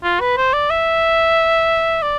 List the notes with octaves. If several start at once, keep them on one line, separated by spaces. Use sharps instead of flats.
F4
B4
C5
D5
E5
D5